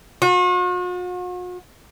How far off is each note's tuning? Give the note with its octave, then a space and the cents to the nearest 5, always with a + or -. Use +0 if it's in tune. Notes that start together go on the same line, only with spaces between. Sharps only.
F#4 -45